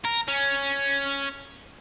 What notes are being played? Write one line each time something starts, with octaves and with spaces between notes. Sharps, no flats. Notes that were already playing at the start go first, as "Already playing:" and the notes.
A#4
C#4